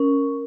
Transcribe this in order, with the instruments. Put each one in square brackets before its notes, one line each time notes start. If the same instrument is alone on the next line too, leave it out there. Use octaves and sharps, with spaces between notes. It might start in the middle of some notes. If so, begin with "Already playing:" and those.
Already playing: [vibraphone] C#4 A#4